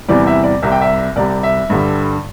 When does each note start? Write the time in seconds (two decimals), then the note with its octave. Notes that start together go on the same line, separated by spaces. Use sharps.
0.08 E2 C3 E3 G3 D5
0.27 E5
0.44 D5
0.62 C2 C3 G3 E5
0.72 G5
0.81 E5
1.16 C2 C3 G3 D5
1.43 E5
1.70 G2 D3 G3